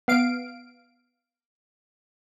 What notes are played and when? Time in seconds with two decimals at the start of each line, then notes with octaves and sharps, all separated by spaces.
0.08 B3 F5 D7